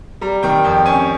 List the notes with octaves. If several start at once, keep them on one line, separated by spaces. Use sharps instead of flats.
G3 A#5
D#3 G5
F2 G5
C#4 G#5